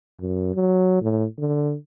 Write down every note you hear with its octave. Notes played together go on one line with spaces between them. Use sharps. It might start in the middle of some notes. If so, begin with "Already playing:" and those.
F#2
F#3
A2
D3